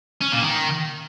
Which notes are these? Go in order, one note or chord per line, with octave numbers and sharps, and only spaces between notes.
C#4
A#2
D#3